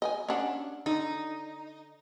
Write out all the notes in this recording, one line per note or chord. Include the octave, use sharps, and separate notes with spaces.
D#5 G5 G#5
C#4 D4 F#5
D3 D#4